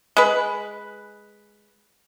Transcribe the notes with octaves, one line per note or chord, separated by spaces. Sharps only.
G#3 B4